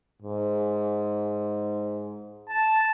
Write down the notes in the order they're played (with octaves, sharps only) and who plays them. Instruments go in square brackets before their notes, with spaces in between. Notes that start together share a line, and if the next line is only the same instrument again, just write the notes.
[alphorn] G#2
[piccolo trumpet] A5